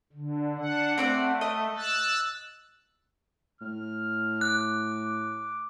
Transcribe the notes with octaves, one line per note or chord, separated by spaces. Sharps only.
D3
D4 F#5
A3 C4 D5 F#5
D#5
E6 F#6 A6
A2 F6
D6 F#6